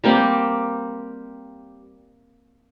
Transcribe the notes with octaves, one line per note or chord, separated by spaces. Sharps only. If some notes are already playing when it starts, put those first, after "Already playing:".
G3 A#3 C4 G4